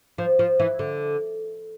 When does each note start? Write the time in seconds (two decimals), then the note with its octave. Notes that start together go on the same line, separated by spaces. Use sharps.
0.18 F3
0.39 F3
0.59 E3
0.79 D3